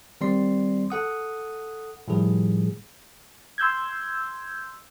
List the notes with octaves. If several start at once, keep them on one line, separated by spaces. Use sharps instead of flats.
D#3 G3 C4 D5 C6 C7
A4 F#5 D#6
A2 D#3 F3 G3 G#4
C6 E6 G6 G#6